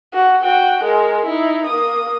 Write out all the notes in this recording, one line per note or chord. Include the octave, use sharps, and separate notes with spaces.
F#4
F#4 G5
G#3 A#4
D#4 E4
A#3 D#6